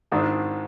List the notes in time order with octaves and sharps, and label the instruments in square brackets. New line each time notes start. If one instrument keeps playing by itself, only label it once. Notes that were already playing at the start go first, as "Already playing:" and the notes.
[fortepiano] G#1 G#2 D#3 D4 E4